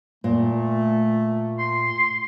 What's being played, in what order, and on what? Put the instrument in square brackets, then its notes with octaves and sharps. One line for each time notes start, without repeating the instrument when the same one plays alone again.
[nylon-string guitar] A#2 [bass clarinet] A3
[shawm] C6